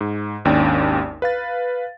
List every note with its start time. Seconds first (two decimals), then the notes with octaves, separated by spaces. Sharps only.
0.01 G#2
0.45 G#1 D#2 C#4 D4 D5 G5
1.22 B4 F5 A6